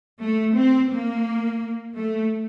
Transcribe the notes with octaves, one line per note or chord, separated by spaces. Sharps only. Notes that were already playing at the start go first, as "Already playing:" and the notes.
A3
C4
A#3
A3